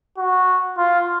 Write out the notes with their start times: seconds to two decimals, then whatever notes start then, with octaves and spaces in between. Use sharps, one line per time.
0.18 F#4
0.78 F4